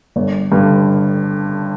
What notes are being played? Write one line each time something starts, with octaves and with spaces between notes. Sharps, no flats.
G1
G2 D3